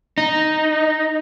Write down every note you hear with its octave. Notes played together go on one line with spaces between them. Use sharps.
D#4